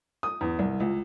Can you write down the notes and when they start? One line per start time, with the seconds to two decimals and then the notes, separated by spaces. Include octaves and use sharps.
0.23 D#6
0.41 E2
0.59 C2
0.80 C#2